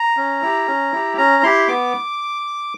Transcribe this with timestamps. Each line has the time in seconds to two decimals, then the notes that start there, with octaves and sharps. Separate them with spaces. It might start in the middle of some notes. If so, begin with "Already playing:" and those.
Already playing: A#5
0.17 C#4
0.42 E4 G4
0.67 C#4
0.92 E4 G4
1.17 C#4 A#5
1.43 E4 G4 C6
1.68 B3 D6